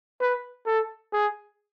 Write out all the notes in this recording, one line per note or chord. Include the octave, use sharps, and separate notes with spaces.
B4
A4
G#4